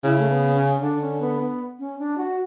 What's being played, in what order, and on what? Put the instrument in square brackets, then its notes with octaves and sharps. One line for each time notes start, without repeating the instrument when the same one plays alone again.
[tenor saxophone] C#3 [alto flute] E4
[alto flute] A3
B3
C#4
[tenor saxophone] D3 [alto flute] D4
[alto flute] C#4
B3
B3
C#4
D4
F#4